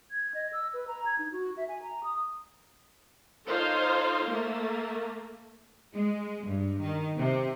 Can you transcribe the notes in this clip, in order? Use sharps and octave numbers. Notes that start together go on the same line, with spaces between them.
G#6
D#5
E6
B4
A#5
G#6
D#4
F#4
E5
G#5
A#5
D#6
D#4 F4 A4 C5 C#5 F5
A3 A#3
G#3
G2
D#3
C3